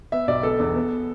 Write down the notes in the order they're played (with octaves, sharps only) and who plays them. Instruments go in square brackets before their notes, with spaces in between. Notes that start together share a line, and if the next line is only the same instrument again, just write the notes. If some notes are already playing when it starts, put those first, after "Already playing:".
[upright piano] B3 E5
B1 D5
B3 A4
E2
B3